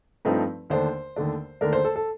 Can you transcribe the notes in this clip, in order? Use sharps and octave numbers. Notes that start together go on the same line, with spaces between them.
G2 F3 A3 C4 D#4
D#2 D3 A3 D4 C5
D#2 D3 A3 D4
D#2 D3 A3 D4 A#4
C5
A4
A4